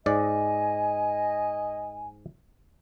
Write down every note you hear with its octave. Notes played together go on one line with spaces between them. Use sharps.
G#2 D5 D#5 G#5